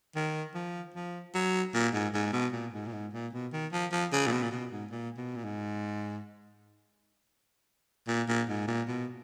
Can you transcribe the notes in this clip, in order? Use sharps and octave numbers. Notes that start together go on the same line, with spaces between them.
D#3
F3
F3
F#3
A#2
G#2
G#2
B2
A#2
G#2
A#2
G#2
A#2
B2
D#3
F3
F3
C#3
A#2
B2
A#2
B2
G#2
A#2
B2
A#2
G#2
A#2
A#2
G#2
A#2
B2